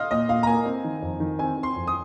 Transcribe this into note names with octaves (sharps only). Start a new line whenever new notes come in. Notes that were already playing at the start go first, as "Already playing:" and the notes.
Already playing: D#5 F5 C6 F6
A#2 D#5
A#2 F5
A#5
A#3 G#5
C4
D#3
F2
D#3
C4 G#5
C4
C6
F2
D#6